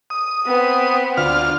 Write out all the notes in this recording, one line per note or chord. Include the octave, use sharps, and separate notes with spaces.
D#6
B3 C4
D2 F4 F6